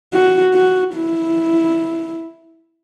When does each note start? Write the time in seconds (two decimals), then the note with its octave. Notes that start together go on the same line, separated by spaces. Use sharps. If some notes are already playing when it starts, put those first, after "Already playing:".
0.14 F#4
0.54 F#4
0.95 E4